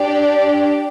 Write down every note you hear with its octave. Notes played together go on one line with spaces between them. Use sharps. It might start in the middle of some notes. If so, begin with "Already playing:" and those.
Already playing: D4 G4 D5